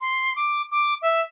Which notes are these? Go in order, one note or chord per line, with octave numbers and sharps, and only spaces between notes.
C6
D6
D6
E5